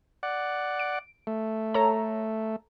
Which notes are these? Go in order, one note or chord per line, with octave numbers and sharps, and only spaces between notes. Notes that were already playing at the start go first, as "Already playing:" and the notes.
D5 F#5
D7
A3
A4 C#5 A#5